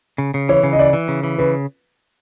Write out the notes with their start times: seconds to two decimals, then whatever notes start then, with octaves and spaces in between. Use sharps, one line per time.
0.18 C#3
0.34 C#3
0.49 E3 C#5
0.64 C#3
0.73 D#5
0.79 E3 D5
0.93 E3
1.08 C#3
1.24 E3
1.38 C#3 B4